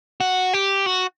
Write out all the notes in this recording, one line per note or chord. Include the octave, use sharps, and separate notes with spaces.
F#4
G4
F#4